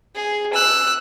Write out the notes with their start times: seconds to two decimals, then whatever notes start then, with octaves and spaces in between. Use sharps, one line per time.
0.15 G#4
0.53 E6 F#6